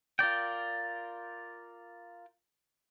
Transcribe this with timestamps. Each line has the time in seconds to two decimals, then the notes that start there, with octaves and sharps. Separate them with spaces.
0.19 F4 A#4 D5 G5